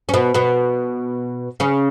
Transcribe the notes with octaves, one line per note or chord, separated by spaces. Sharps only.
C#4
B2 B3
B2 B3
C#3 C#4